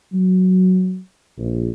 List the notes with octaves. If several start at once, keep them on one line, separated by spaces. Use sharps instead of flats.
F#3
A#1